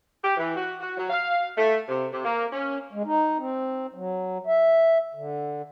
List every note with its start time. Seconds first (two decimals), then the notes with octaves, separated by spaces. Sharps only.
0.23 G4
0.37 E3
0.55 F#4
0.81 F#4
0.97 F#3
1.10 F5
1.56 A3
1.88 C3
2.11 C3
2.24 A#3
2.52 C#4
2.92 G#3
3.05 D#4
3.38 C4
3.94 F#3
4.46 E5
5.15 D3